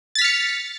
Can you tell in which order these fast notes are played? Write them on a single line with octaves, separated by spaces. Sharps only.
A6 B6 F6 C#7